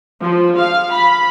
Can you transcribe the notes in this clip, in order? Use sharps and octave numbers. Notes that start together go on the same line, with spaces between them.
F3
F5
B5